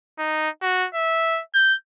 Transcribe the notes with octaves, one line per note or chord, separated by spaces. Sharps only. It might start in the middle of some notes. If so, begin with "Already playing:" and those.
D#4
F#4
E5
G6